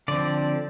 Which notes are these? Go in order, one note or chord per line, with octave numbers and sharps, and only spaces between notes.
D3 F3 C4 D5